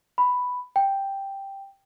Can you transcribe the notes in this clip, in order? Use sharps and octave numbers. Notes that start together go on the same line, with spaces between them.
B5
G5